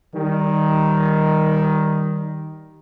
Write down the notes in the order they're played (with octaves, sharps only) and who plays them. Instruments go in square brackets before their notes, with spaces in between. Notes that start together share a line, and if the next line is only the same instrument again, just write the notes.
[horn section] D#3 G3